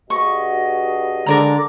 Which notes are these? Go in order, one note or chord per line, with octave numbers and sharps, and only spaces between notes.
G2 F#4 G#4 D#5 C#6
D3 G#3 A#4 D5 A#5